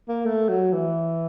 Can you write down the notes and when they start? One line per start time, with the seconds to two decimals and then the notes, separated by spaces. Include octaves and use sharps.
0.08 A#3
0.26 A3
0.49 F#3
0.73 E3